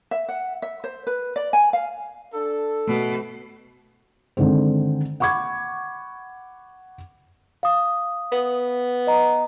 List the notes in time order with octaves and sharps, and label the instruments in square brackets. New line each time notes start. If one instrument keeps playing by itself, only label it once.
[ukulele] E5
F#5
E5
C5
B4
D5
G#5
F5
[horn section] D4 A4
[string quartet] B2 [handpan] A3
[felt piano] D3 D#3 G#3 C4
F#5 B5 C#6 D6 G#6
[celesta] F5 D#6
[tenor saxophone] B3
[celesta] D#5 A#5